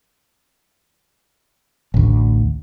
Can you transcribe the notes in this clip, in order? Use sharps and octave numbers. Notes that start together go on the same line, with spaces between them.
A1 D2